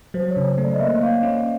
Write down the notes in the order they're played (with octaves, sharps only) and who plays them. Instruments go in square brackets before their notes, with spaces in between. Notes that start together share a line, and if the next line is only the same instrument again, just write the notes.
[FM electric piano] F#3 [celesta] C5
[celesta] C#5
[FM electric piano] C#3
A3
[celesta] D5
D#5
[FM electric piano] A#3 [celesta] E5
[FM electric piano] A#3 [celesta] F5
[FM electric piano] C#4